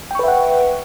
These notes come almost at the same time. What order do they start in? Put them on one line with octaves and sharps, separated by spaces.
G5 C#6 B4 E5 F#5